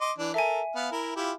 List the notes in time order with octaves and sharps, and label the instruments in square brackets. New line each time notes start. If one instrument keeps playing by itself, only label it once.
[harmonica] D#5 C6 D6
E3 D4
[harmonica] A4 A#4 [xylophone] E5 G#5
[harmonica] B3 F5
E4 A#4
E4 F4 G4